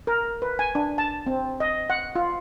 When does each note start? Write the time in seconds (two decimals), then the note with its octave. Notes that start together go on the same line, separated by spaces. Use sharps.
0.07 A#4
0.42 B4
0.59 G#5
0.75 D4
0.98 A5
1.27 C4
1.60 D#5
1.90 F#5
2.16 F4